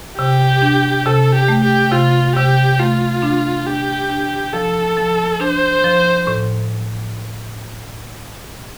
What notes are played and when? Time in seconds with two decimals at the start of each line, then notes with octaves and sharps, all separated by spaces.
0.18 C3 G4
0.62 D4
1.06 C3 A4
1.34 G4
1.48 A3
1.63 G4
1.92 C3 F4
2.36 C3 G4
2.79 A3 F4
3.22 D4
3.66 D4 G4
4.10 D4
4.53 F3 A4
4.97 F3
5.40 D4 C5
5.84 F3
6.27 A2